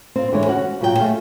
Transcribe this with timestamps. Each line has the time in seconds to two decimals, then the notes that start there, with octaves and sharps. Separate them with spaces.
0.16 C4 F4
0.32 D3 E3 G#3 C#5
0.46 C#4 F#4 F#5
0.81 A#2 C#3 F#3 G#4 G5
0.97 A3 F4 G#4